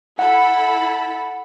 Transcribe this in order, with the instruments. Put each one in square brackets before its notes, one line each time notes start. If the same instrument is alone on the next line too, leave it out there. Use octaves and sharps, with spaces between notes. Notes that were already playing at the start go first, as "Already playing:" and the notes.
[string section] E4 A4 B5 [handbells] F#5